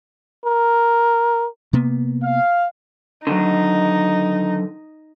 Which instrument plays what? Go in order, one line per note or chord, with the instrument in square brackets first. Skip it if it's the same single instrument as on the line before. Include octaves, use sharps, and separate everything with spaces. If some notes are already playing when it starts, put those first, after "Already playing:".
[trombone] A#4
[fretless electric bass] C3 A#3 B3
[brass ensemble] F5
[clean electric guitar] D3 D#3 F#3 [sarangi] D#4